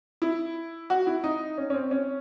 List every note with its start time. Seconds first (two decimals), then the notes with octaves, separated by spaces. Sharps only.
0.22 E4
0.90 F#4
1.07 E4
1.24 D#4
1.58 C#4
1.70 C#4
1.74 C4
1.91 C#4